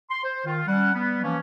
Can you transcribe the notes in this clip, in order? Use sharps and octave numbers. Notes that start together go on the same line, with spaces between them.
C6
C5
D#3 F4
G3 C#4 F#5
G3 B3
E3 F3 A#3 C#4